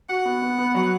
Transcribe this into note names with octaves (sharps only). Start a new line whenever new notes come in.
F#4 F#5
B3
B3
B3
F#3